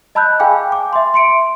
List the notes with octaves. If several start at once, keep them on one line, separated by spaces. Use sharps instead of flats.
D#5 A5 B5 E6 F#6 G6
G#4 F5 G5 G#5 D6
D6
E5 C6
C6 C#7 D7